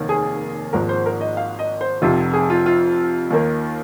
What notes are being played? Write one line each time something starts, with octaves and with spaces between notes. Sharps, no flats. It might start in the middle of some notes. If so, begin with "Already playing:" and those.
Already playing: F1 D#2 D#3 A#3
G#4
G#1 G#2 F3 A#3 A#4
C5
A#4
D#5
F5
D#5
C5
F1 F2 C3 F4
G#4
F4
F4
D#2 D#3 A#3